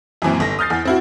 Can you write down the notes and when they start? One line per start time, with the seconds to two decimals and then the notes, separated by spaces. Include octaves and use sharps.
0.22 F#2 A#2 E3 C4
0.40 G1 A#6
0.59 D#6 F6 G6 A6 C7
0.70 E2
0.85 C4 E4 F#4